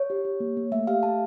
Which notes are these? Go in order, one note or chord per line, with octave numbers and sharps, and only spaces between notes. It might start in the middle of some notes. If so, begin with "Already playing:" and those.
Already playing: C#5
G4
G4
A#3
A#3
A3 E5
G4 F5
A3 A5